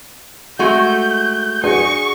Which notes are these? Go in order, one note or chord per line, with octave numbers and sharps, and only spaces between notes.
G#3 A3 F#4 G6
D4 F#4 G#4 G#5 C#6